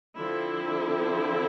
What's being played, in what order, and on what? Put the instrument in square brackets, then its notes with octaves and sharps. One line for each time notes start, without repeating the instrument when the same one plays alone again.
[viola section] D3 F3 C4 E4